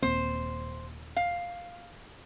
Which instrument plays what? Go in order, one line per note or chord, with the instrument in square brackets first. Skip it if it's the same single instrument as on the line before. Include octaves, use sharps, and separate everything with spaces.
[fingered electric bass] D#1 A#3 C4 [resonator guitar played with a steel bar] C5
[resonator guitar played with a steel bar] F5